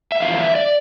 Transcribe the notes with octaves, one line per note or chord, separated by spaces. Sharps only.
E5
E2 D3 F3 F5
E5
D5